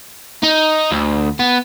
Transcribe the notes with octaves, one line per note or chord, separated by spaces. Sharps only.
D#4
D2
B3